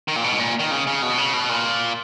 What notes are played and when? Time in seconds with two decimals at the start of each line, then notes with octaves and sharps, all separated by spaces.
0.08 D#3
0.16 A#2
0.24 B2
0.33 G#2
0.39 A#2
0.59 D#3
0.71 C#3
0.87 C#3
1.02 B2
1.18 C#3
1.34 B2
1.49 A#2